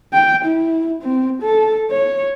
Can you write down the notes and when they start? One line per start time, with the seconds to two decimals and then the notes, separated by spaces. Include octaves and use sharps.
0.14 G5
0.45 E4
1.02 C4
1.42 A4
1.91 C#5